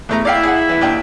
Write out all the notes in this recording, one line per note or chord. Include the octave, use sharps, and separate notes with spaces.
E2 A3 A#5
E4 D5 F5 G5
G#4 F#5
E3
D#2 D4 G5